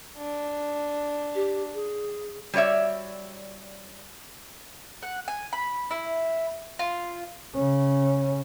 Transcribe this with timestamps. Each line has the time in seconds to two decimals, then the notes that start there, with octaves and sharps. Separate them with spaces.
0.17 D4
1.35 G4
1.73 G#4
2.54 G3 F#4 C#5 D5 E5
5.02 F#5
5.28 G#5
5.53 B5
5.91 E4
6.79 F4
7.55 C#3 C#4